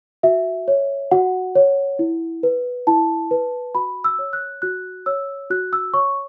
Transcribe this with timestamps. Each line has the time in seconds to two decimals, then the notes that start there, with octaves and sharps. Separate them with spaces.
0.23 F#4 E5
0.68 C#5
1.11 F#4 F#5
1.55 C#5
1.99 E4
2.43 B4
2.87 E4 A5
3.31 B4
3.75 F#4 B5
4.04 E6
4.19 C#5
4.33 F#6
4.62 F#4 F#6
5.06 C#5 E6
5.50 F#4 F#6
5.73 E6
5.94 C#5 C#6